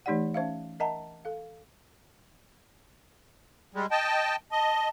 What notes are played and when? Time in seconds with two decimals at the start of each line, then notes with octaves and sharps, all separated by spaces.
0.06 E3 A3 D#4 G4 D5 F#5
0.34 C#4 C5 E5 F5
0.80 A#4 D#5 E5 F#5 A5 A#5
1.25 A4 F5
3.74 G3 G#3
3.91 D#5 G5 A5
4.52 D#5 A5